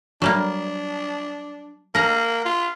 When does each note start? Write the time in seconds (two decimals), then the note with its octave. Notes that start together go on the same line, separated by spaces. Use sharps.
0.22 F#3 G3 A#3 D4
1.95 A#3 A#4 A#5
2.45 F4